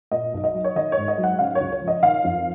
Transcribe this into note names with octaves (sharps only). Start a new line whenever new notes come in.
A#2 D#5
B1
D#5
F#3
C#5
D#3 D#5
C#5
G#2
D#5
F#3
F#5
C#3 F5
C#5
C#2
C#5
F3
D#5
D#3 F5
F2